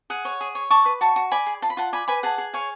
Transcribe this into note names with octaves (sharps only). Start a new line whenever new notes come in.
G#4 F#5
C#5
G#4
C#5
D5 A5 C#6
B4
F#4 A5 C#6
F#4
D5 G#5 B5
G#4
F4 A5
B5
F4 F#5 A5
D5 G#5 B5
B4 G#5 B5
G#4 F#5 A5
G#4
C#5 F5 G#5